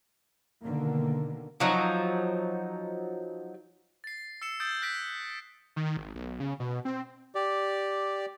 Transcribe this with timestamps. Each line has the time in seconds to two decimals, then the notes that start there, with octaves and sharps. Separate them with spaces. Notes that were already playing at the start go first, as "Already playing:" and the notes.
0.64 B2 D3 D#3 A#3
1.60 F3 F#3 D#4
4.04 A6 C7
4.42 E6 C7 C#7 E7
4.60 D#6 E6 G6 A6 C7 D7
4.82 F#6 A#6 B6 D7
5.76 D#3
5.97 G#1
6.15 B1
6.40 C#3
6.60 B2
6.85 C4
7.35 G4 D5